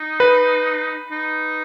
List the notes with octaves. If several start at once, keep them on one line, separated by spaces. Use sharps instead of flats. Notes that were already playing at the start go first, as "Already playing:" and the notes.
Already playing: D#4
B4
D#4